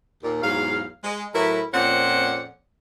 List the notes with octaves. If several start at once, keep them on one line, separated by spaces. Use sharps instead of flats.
D#2 A#2
E2 G#2 F#3 F5
G#3
A2 F#3 E4 A#4 B4
F2 A#2 C4 C#4 D5 F#5